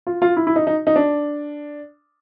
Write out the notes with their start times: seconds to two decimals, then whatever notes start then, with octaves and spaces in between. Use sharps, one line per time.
0.07 F4
0.22 F4
0.37 E4
0.47 E4
0.56 D#4
0.67 D#4
0.87 D#4
0.96 D4